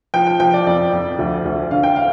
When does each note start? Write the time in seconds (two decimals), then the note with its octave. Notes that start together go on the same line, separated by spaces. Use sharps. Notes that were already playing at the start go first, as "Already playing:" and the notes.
0.14 F3 G5
0.27 G5
0.40 F3 G5
0.54 D5
0.66 F2 D5
0.93 F2
1.18 D2
1.45 D2
1.71 D3 F5
1.83 G5
1.96 F5